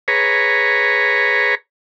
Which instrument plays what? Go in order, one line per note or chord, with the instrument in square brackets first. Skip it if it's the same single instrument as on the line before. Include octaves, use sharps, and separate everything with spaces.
[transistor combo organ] G#4 B4 C#5 A#5